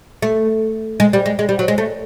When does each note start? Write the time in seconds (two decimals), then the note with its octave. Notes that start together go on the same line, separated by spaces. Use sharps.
0.22 A3
1.00 G#3
1.13 G3
1.26 G#3
1.39 G#3
1.49 G3
1.59 F#3
1.68 G#3
1.78 A3